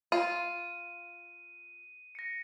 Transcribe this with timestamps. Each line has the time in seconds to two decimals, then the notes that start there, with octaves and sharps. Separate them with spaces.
0.12 F4 D#7
2.15 A#6 C#7